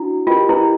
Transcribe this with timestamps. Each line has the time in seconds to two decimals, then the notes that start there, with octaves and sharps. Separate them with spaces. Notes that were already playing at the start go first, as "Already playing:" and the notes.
Already playing: D4 E4 F#4
0.27 F4 G4 A#4 D#5 G5
0.49 E4